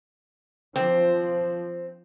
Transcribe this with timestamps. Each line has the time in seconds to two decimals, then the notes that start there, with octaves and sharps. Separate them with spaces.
0.76 F3 C4